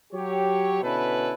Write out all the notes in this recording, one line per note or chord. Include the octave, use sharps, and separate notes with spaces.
F#3 G4 C#5
B2 D3 C#4 E4 A4 B4